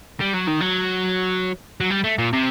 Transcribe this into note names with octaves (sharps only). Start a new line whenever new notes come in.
G3
F#3
D#3
F#3
F#3
G3
A3
A#2
C3